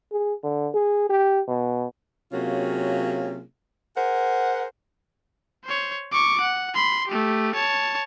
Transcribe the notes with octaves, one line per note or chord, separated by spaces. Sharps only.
G#4
D3
G#4
G4
B2
C3 F#3 A#3 C#4 F4 G#4
G#4 A#4 C5 F#5
C5 C#5
C#6 D6
F#5
B5 C6
A3 G4
C#5 A5